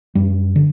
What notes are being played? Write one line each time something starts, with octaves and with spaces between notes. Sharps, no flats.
F#2 G3
D3